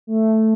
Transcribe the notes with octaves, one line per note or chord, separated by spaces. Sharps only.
A3